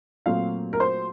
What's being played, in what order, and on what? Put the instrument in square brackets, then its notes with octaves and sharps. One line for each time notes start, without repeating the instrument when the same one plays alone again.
[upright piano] A#2 F#3 A3 C4 F5
A#4
C5